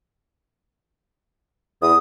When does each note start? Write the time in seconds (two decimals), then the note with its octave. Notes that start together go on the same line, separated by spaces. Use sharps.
1.82 E2 D#6